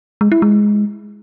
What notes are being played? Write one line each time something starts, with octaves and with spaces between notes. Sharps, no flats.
G#3
E4
G#3